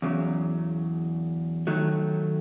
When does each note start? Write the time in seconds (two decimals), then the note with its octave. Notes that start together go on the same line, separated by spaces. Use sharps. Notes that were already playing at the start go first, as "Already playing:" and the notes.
0.02 E2 C#3 F#3
1.67 D#3 F#3 A3